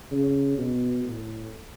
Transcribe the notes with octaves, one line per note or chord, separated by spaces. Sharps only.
C#3
B2
A2